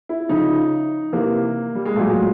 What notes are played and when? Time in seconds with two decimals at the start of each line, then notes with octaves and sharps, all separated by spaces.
0.09 E4
0.29 C#3 F3 D#4
1.13 C3 E3 A#3
1.75 G3
1.85 G#3
1.96 A#2 F#3 A3
2.09 G#3